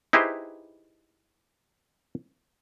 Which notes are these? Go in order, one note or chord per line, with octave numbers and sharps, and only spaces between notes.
D#4 E4 G4 G#4 B4 C5